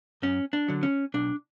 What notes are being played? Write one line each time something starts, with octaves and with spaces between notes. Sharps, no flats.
F#2 C#4
D4
D3 F#3
C#4
B1 D4